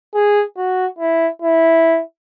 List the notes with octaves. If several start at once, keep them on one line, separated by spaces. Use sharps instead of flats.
G#4
F#4
E4
E4